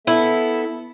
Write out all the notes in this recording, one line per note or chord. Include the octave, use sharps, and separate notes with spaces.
B3 E4 A4 E5